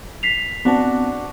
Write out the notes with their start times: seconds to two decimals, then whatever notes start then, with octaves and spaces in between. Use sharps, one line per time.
0.23 B6 C7 F7
0.65 B3 C4 D4 F#4 A5